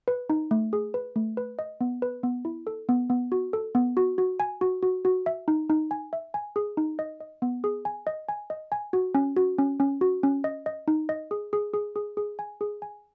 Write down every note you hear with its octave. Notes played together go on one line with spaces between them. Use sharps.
B4
D#4
A3
G#4
B4
A3
B4
D#5
B3
B4
B3
E4
A4
B3
B3
F#4
A4
B3
F#4
F#4
G#5
F#4
F#4
F#4
E5
D#4
D#4
G#5
E5
G#5
G#4
D#4
D#5
D#5
B3
G#4
G#5
D#5
G#5
D#5
G#5
F#4
C#4
F#4
C#4
C#4
F#4
C#4
D#5
D#5
D#4
D#5
G#4
G#4
G#4
G#4
G#4
G#5
G#4
G#5